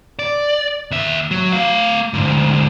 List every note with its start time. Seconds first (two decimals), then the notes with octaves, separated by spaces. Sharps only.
0.19 D5
0.91 D#2 E5
1.31 F#3
1.53 A3 F5
2.14 D2 G#2